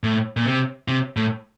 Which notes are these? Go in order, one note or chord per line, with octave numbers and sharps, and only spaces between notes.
A2
A#2
C3
C3
A2